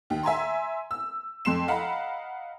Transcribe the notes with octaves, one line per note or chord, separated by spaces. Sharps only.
D#2
E5 G#5 A#5 C6
E6
F2 C6 C7 E7
D#5 F5 F#5 A#5 B5